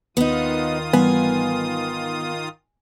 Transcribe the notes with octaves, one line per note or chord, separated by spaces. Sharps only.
D#2 D#3 B3 D#4 F4 D#6
G#1 E3 G3 B3 G#5